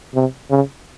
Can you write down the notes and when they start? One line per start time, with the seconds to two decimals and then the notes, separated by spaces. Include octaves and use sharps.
0.15 C3
0.50 C#3